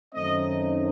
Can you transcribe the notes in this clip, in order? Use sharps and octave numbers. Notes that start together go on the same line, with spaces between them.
F#2 D#3 A3 C4 D#4 D#5